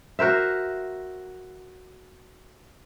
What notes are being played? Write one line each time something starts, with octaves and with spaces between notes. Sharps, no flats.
F#4 A#4 C5 E5